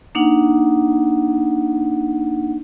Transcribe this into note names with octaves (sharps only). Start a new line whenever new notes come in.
A#3 D4 D#4 F#5